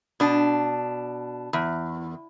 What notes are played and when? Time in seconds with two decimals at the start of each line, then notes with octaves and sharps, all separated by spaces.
0.20 B2 D4
1.53 E2